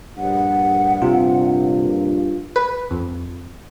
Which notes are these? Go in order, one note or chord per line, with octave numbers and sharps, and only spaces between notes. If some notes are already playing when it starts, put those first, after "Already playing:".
A#1 G2 F#5
C3 F4
B4
F2